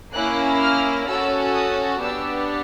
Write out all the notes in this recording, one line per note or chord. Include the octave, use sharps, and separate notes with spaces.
A#3 C#4 E4 F#6
F6
C#4 F#4 A4 E6
D#6
B3 D4 G4 E6